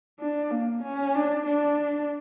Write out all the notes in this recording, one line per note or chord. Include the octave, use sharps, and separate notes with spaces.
D4
A#3
C#4
D4
D4